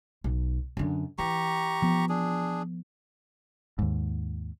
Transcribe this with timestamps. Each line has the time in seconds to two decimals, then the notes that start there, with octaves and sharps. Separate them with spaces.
0.24 B1
0.77 F#2 D3
1.18 E3 G4 A#5 C#6
1.82 F3 B3
2.09 D4 G#4
3.79 D#2 G#2